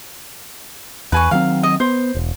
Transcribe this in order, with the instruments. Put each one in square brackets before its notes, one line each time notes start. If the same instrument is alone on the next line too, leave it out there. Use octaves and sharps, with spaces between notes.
[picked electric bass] E2 [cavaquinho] B4 G#5 C#6
[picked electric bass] D#3 F#3 C4 [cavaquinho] F5
[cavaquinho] D#5
[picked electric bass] B3 [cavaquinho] C5
[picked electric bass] E1